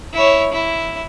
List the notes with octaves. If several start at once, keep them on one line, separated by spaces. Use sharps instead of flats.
E4 C#5
E4